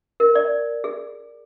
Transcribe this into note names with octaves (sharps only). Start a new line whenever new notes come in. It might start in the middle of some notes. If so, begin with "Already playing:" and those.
A#4
D5
G#4